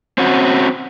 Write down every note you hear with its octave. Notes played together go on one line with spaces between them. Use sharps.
C4 C#4 F#4